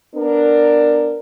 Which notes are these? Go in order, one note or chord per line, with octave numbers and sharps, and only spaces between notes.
B3 D4 A#4